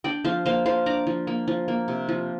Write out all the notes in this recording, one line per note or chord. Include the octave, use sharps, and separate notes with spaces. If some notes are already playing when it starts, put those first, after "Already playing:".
D4 D5 G5
F3 C5 F5
A#3 C5 F5
F3 C5 F5
D4 A#5 D6
F3
A#3
F3
A#3
C3
F3